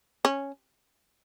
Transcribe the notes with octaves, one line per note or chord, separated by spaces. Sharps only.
C#4